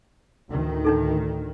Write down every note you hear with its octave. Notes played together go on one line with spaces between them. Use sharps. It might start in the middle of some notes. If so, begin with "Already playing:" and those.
D2 A2 D#3
D4 D#4 A4